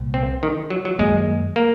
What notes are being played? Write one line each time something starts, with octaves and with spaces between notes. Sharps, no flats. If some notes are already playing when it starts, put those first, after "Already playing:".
Already playing: C2 A#2
C4
D#3
F#3
F#3
F#2 D#3 G#3 A#3
A#3